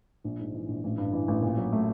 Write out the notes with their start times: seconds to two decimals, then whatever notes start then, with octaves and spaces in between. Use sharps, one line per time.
0.24 A#1
0.39 G#2
0.54 E3
0.68 A#1
0.84 A1
0.98 G2
1.13 E3
1.28 A1
1.42 A#2
1.57 F#3
1.73 A3